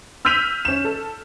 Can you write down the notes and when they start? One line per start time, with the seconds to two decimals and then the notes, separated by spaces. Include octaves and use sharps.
0.25 E6 F6 G6 B6 D#7 F7
0.65 C#4 E7
0.85 A4